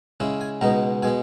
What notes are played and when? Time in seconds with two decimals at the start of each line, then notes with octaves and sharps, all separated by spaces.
0.20 C#3 G#3 C#4 E4
0.41 G#5
0.61 C#2 B2 G#3 B3 D#4 A#5
1.03 B2 G#3 B3 G#5